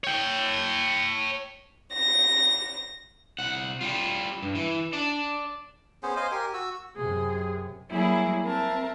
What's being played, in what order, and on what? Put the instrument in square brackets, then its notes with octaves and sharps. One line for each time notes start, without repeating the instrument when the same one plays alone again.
[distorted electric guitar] C#5 G5
[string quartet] A#6
[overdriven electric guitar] C2 F#5
G3 F4
G2
E3
D5 A5
[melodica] B3 C#4 G#4 C5
C5 D#5 F5 G#5
G4 A#4 G#5
F#4 E6
[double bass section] F#2 C3 [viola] G#4
[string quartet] F#3 G3 A#3 E4 G#4
C4 A#4 E5 A5